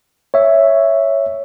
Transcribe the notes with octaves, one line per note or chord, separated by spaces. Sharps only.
C#5 E5